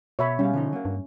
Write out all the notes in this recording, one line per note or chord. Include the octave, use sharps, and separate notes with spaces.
B2 C#5 E5 B5
G3 C#4 F5
D3 F3 D#4
F#3 A#3
G2